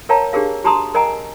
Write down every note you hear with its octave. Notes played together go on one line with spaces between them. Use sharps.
A#4 C#5 F5 G5 A5 A#5
D4 G4 G#4 A#4 F5
F#4 G4 A5 A#5 C6 D#6
A#4 D#5 F#5 G#5 A#5